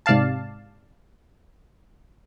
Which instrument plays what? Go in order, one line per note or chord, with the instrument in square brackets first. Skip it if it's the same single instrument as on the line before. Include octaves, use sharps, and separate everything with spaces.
[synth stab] G#2 C3 D5 F5 A5